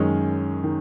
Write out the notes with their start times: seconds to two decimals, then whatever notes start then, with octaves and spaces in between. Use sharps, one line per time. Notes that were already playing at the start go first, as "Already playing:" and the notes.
Already playing: F#2 D#3 G#3 C#4
0.64 D#3